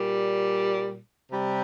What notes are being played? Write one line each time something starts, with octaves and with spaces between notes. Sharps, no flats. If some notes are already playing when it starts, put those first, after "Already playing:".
Already playing: A#2 G3
C3 G3